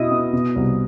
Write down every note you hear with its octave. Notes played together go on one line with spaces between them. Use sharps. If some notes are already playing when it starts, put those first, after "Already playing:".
Already playing: B2 E4 D#5 D#6
B3
B2
C2